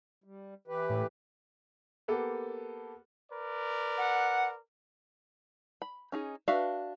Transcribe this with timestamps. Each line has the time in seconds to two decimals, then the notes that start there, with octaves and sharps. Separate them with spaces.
0.24 G3
0.68 E3 G4 B4
0.90 A2
2.08 A#3 B3 G4 A4
3.32 A#4 B4 D5
3.98 F#5
5.82 B5
6.12 C#4 D#4 G#4
6.48 D4 F#4 B4 E5 F5